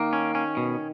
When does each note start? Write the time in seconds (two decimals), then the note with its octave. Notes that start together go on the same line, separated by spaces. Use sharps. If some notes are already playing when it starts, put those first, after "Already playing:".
Already playing: D#3 A#3
0.13 C#4
0.35 C#4
0.57 B2